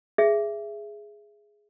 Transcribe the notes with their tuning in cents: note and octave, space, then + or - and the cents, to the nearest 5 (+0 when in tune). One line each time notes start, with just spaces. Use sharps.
G#4 +0 E5 +15